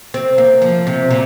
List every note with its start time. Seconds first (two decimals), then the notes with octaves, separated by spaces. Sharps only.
0.14 C4
0.38 A#3
0.62 F3
0.87 C3
1.11 A#2